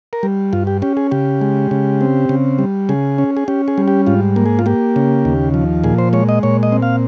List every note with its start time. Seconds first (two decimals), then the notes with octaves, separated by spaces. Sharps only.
0.13 A#4
0.23 G3
0.53 G2 F4
0.67 G4
0.82 C#4 G4
0.97 G#4
1.11 C#3 G4
1.41 G#3
1.71 C#3
2.01 C4
2.29 C#3
2.59 G3
2.89 C#3 G#4
3.18 C#4
3.37 G#4
3.48 C#4 G4
3.68 G#4
3.78 G3
3.88 G4
4.07 G#2 F4
4.36 A#3
4.46 G#4
4.59 F4
4.66 A#3 G4
4.96 C#3
5.25 D#2
5.54 F3
5.84 A#2 G#4
5.98 C5
6.13 G#3 C#5
6.29 D#5
6.43 A#2 C#5
6.63 D#5
6.72 C4
6.82 F5